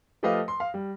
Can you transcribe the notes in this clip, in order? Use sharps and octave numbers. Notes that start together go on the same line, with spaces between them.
F3 A3 G4 B4 D#5 F5
C6
F5
G3